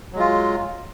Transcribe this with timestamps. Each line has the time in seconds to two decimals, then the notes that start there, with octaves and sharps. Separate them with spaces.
0.13 F#3
0.16 G#3
0.19 F4